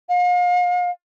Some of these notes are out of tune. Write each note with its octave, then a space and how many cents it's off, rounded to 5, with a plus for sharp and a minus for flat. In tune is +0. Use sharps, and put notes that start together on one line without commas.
F5 +40